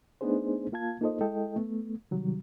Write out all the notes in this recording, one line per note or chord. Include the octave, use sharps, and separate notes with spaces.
A3 B3 D4 D#4 G#4 C5
A#3 F4 F5 A5 G#6
A#3 D#4 F4 A4 C5 D#5
G#3 E4 A4 D#5 G5
A3 B3
C3 D#3 F#3 G3